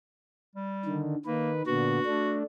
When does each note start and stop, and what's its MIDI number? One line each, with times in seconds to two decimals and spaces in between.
0.55 1.01 55
0.85 1.15 50
0.85 1.15 51
1.26 1.62 51
1.26 1.51 58
1.26 1.62 71
1.67 1.99 46
1.67 1.99 50
1.67 1.99 59
1.67 2.37 66
2.06 2.43 57
2.06 2.43 62